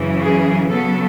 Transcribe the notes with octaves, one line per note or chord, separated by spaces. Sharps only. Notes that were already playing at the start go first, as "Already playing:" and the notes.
Already playing: F#2 C#3 E3
G#4
C#3 F#3 B3 A4